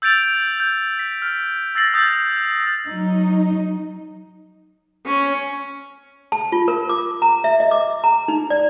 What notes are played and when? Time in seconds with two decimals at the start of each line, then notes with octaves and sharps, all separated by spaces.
0.02 E6 G6 A6 D7 F7
0.60 G6
0.99 B6
1.22 F6
1.75 E6 A6 A#6 C7 F#7
1.94 D#6 E6 G6 A6
2.86 F#3 D#4
5.06 C#4
6.32 A5
6.52 F4
6.68 A#4
6.89 D6
7.22 A#5
7.44 E5
7.60 D#5
7.71 D6
8.04 A#5
8.28 D#4
8.50 D5